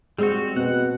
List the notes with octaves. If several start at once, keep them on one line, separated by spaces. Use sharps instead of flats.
G3 G#3 C4 F#4
B2 C4 F#5